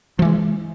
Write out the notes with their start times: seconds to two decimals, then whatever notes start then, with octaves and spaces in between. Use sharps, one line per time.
0.19 F3
0.22 E3
0.25 G#3